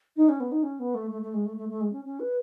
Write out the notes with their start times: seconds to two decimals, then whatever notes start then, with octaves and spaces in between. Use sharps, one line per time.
0.16 D#4
0.29 C#4
0.40 B3
0.52 D#4
0.63 C#4
0.79 B3
0.94 A3
1.11 A3
1.22 A3
1.34 G#3
1.46 A3
1.57 A3
1.69 A3
1.81 G#3
1.92 C#4
2.05 C#4
2.20 B4